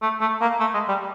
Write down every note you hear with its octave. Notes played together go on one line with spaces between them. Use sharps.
A3
A3
A#3
A3
G#3
G3